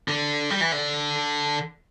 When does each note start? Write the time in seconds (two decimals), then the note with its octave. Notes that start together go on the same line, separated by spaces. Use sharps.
0.08 D3
0.50 G3
0.61 E3
0.72 D3